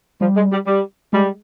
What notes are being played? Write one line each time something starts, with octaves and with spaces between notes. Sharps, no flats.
F3 G3
G#3
G3
G3
G3 G#3